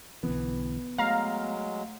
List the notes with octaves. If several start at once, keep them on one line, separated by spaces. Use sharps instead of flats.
B1 D3 E3 B3
F#3 G#3 A3 F5 A#5